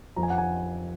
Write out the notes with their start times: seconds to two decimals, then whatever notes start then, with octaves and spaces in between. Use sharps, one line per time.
0.16 F2 F3 A#5
0.23 G#5
0.30 F#5
0.38 G#5